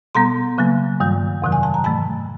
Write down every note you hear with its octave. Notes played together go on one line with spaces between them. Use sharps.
B2 G3 B3 A#5 C6
C#3 F#3 A#3
G2 D#3 G3
F2 C3 D#3 F#3
G#5
A5
A#5
G#2 E3 A3 A5 B5